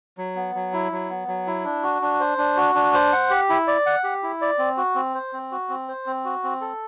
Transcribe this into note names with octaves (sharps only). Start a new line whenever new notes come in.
F#3
B3
F#3
E4
F#3
B3
F#3
E4
D4
F#4
D4
C5
D4
F#4
D4
C5
F#5
G4
E4
D5
F#5
G4
E4
D5
C4
F#4
C4
C5
C4
F#4
C4
C5
C4
F#4
C4
A4